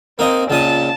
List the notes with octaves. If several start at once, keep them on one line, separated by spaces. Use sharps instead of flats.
A#3 C4 D#4 D#5
C#2 A#2 A5 D#6